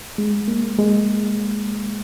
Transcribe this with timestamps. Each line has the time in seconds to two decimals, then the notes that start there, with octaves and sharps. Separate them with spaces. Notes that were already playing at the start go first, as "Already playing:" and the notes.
0.18 G#3
0.48 A#3
0.79 G#3